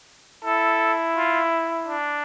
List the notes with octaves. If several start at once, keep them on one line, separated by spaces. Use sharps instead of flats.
E4 A4
F4
D4